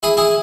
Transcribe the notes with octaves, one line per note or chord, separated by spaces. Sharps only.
E4 G#4
E4 G#4